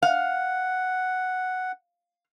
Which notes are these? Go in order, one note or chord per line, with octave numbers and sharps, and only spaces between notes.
F5 F#5